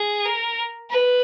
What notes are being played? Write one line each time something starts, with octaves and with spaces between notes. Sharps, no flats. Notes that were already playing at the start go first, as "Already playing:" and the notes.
Already playing: G#4
A#4
B4